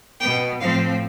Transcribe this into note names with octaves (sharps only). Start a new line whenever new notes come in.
B2 B3 G5
A2 F3 C4 F5